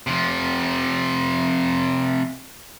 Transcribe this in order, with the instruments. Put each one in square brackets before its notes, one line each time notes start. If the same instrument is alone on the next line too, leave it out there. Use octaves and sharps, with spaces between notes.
[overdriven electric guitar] C3 F3